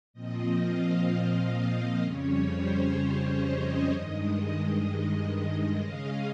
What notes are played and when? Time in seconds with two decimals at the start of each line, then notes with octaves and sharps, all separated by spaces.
0.13 A#2 F3 C4 D#5
0.61 F5
1.07 D#5
1.55 D#5
2.02 F2 C#3 G3 C#4 C#5
2.49 C5
2.96 C#5
3.44 D#5
3.91 G2 D#3 G#3
5.79 C#3 G#3 C#4 F5